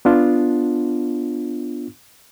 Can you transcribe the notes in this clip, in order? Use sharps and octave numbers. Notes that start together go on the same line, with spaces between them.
B3 D4 F4